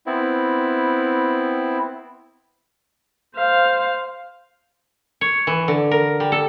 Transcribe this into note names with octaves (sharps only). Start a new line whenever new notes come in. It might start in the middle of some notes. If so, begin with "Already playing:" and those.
B3 C4 E4
C5 F5
C#5
E3
D3
A#4
G3
A4